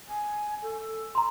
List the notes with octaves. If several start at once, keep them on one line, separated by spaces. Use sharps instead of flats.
G#5
A4
A#5 C6